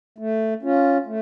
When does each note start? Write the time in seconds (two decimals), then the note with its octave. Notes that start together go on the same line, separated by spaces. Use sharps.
0.18 A3
0.62 C#4 F4
1.06 A3